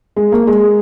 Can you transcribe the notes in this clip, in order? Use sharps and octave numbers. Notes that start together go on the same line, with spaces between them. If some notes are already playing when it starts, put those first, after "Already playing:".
G#3
A#3
G#3